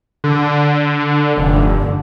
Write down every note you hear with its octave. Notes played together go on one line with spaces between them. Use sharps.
D3
F1 G2 D3